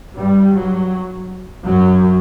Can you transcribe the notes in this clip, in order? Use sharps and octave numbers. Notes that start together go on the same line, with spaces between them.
G2 G3
F#3
F#2 F#3